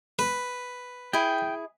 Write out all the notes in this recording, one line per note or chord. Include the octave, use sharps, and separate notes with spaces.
B4
E4 G#4 G5